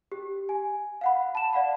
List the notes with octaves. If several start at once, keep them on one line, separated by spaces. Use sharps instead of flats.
G4
G#5
F5 F#5 B5
A5 E7
D5 F5 F#5 B5